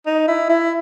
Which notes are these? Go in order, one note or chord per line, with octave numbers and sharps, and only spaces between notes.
D#4
E4
E4